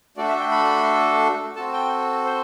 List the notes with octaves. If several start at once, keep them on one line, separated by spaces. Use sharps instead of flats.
A3 D4 F#4 A4 D5
E5
G5
B5
C4 F#4 A4 A5
G5
C5